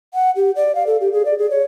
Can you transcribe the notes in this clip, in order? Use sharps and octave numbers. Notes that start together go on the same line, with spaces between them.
F#5
G4
D5
F5
A4
G4
G#4
D5
G#4
C#5